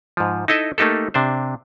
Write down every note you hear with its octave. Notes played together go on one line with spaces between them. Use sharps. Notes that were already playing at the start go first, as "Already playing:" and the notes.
G#2 F3
D#4 E4 A4 D#5 E5
A3 A#3 D#4 G4 A4
C3 D4 C5